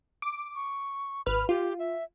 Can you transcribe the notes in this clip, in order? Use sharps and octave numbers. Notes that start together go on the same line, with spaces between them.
D6
C#6
G#1 B4 B5 F6
F4 G4
E5